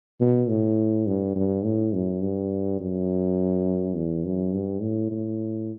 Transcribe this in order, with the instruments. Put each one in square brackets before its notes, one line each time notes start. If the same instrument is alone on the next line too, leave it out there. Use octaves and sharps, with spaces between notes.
[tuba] B2
A2
G2
G2
A2
F#2
G2
F#2
E2
F#2
G2
A2
A2